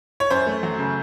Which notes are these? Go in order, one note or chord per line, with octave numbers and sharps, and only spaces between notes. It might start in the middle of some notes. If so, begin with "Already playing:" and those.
C#5
F#2 C5
A3
F#3
C#3